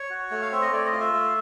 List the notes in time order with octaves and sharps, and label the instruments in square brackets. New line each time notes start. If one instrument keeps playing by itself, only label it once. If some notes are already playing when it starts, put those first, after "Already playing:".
Already playing: [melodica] C#5
F#4
A3
F5
C4 E5
D#5
A3 D5
D#5
F4
E5
A3